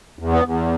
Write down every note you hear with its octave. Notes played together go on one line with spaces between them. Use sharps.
E2
B3
E2